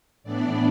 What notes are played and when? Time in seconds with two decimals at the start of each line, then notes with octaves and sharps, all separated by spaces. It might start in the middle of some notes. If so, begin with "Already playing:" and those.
0.24 A2 E3 B3 D4 D5